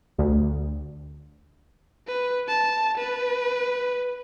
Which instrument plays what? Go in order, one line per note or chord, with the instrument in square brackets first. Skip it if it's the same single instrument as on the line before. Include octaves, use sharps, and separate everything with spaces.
[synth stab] D2
[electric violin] B4
A5
B4